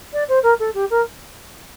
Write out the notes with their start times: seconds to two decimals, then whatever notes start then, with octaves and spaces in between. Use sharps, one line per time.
0.13 D5
0.28 C5
0.42 A#4
0.59 A4
0.74 G4
0.90 A#4